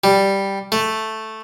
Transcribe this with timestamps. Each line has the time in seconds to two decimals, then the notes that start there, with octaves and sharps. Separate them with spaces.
0.04 G3
0.72 A3